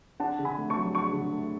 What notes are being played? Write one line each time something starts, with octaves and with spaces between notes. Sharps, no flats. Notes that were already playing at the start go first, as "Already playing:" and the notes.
D4 F#5 A5
D3
G#5 B5
A3
A5 C#6
F#3
D4 A5 C#6
D3
A3